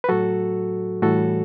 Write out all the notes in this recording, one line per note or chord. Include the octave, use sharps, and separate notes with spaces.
B4
A2 F#3 F#4 A4
A2 E3 G3 F#4 A4